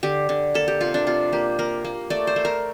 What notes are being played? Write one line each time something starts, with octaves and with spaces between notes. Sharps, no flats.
D3 G4
D3
A#3 A4
G4
C3 F4
D4
C3 F4
A#3 G4
A#3 A#4
A#3
A3 D5
C5
A3
A#4